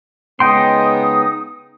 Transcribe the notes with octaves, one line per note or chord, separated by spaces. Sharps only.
C#3 G#3 B3 D#4 G5 C6 D#6